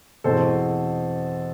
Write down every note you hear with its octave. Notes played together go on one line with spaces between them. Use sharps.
E2 B2 G#3 C4 A4 C5